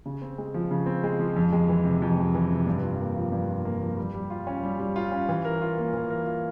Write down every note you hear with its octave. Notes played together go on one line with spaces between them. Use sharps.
C#3
C4
G#3
F3
C#3
C4
G#3
F3
F2
G#3
E3
C3
F2
G#3
E3
C3
G2
F4
A#3
F3
G2
F4
A#3
F3
G3
G3
F4
C#4
G3
G3
F4
C#4
E3
A#4
F4
A#3
E3
A#4
F4